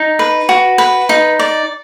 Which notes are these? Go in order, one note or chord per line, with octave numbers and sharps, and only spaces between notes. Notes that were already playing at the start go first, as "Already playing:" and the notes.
Already playing: D#4
B4
F#4
B4
D#4
D5